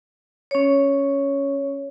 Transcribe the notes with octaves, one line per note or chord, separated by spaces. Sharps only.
C#4 C#5